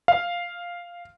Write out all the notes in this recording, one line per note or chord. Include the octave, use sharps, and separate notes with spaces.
F5